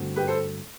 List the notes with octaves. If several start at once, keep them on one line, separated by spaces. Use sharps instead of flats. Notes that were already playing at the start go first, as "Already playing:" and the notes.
Already playing: G2 D3 A3 C4 F#4
G4 B4
A4 C5